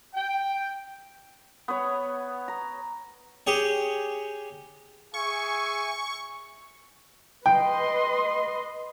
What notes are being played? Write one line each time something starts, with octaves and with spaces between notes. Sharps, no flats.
G5
B3 B4 C#5
A#5
G4 G#4 C#5
G#4 E5 G#5 C#6
B4 D#5 G5 C6